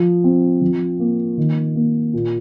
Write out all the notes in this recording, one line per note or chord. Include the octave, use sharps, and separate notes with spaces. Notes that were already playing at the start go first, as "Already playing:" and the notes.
Already playing: F3
C4
F3
A#3
D#3
A#3
A#2